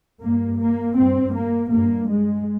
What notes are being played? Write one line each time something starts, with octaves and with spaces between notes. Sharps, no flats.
G2 A#3
A#3
G2 C4
A#3
G2 A#3
G#3